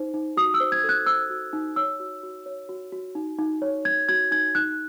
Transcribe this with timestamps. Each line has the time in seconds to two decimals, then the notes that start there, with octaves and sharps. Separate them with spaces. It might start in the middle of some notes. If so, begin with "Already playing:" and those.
Already playing: D#4 C5
0.14 D#4
0.37 F#4 D#6
0.54 E6
0.60 C5
0.72 G#6
0.84 A4
0.89 F#6
1.06 C5 E6
1.30 F#4
1.53 D#4
1.76 C#5 E6
2.00 F#4
2.23 F#4
2.46 C#5
2.69 F#4
2.92 F#4
3.15 D#4
3.39 D#4
3.62 C#5
3.85 D#4 G#6
4.09 F#4 G#6
4.31 D#4 G#6
4.55 D#4 F#6